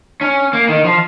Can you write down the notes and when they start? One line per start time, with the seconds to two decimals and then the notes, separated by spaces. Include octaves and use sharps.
0.21 C#4
0.53 A#3
0.69 D#3
0.85 F3